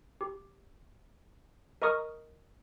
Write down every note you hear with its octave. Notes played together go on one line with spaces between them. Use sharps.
G4
A#4 D#5 A#5 C#6 D#6 F6